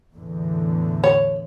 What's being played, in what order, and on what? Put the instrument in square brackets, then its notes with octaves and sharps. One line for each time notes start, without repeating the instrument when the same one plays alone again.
[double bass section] E2 A2 D3
[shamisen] C#5